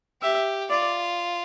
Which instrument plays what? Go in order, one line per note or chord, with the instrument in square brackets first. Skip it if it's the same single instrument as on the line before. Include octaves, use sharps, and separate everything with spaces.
[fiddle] G4 [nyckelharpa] E5
[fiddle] F4 [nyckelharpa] D5